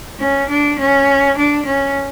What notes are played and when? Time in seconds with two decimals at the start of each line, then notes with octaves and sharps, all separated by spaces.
0.20 C#4
0.49 D4
0.79 C#4
1.37 D4
1.65 C#4